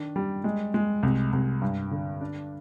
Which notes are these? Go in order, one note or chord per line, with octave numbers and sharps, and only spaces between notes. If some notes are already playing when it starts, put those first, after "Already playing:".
Already playing: D#3 D4
G3
G#3
G#3
C2
C2
G2
D3
D4